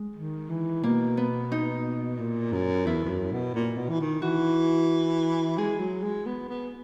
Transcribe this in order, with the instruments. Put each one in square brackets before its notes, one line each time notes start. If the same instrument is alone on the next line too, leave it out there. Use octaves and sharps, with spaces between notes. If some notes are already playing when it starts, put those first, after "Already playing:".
Already playing: [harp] G#3
[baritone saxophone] D#3
E3
[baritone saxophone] B2 [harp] A#3
[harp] B3
D#4
[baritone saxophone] A#2
F#2
[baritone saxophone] E2 [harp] E4
[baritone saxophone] E2
F#2
B2
A#2
B2
E3
D#3
[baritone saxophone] E3 [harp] F#4
[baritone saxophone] G#3 [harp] G#4
[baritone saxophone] F#3
G#3
B3
B3